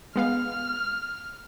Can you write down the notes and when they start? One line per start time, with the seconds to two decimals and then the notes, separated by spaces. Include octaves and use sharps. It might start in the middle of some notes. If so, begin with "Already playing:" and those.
0.16 G#3 B3 F5 F6